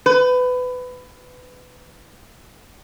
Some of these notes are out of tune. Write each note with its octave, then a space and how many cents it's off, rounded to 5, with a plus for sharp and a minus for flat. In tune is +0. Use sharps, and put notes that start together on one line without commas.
B4 +20